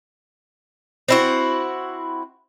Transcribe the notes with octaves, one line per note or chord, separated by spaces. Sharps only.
C4 E4 F#4